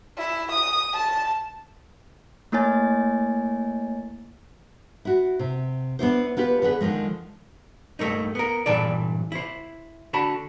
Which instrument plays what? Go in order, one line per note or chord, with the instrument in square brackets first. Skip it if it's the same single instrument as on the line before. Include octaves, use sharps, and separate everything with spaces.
[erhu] E4
D#6
A5
[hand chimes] A3 A#3 E4 C#5 G#5 A6
[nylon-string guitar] E4 F#4
C3
B3 D4 E4 C5
B3 F4 G4 B4
D3 B3 G#4 B4
D3 D#3 F3 G#3
[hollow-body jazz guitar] G2 A3 A#3 D#4
B3 A#4
G2 A#2 E3 A4 D5
E4 C5
D3 F#4 A5 B5